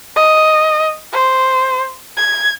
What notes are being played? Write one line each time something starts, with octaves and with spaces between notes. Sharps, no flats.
D#5
C5
G#6